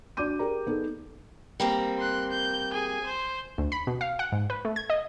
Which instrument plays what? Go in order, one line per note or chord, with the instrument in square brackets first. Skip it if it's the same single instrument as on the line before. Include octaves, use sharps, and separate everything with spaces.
[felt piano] D4 F#4 D5 D6 G6 D#7
G4 G#4 A#4 D5 A#5
B3 D#4 G#4 A4
[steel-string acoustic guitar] G3 A#3 C4
[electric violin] C6 F#6
G6
G#4 G#5
C5
[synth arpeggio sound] D2
B5
B2
F5
F#5
G#2
B4
A3
G#6
D#5